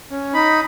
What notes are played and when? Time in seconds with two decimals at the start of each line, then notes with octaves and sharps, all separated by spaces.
0.11 C#4
0.34 D#4 B5